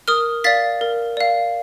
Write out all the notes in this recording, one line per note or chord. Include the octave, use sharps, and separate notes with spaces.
A#4 D#6 F6
D5 F5 A6 B6
A#4
D5 F5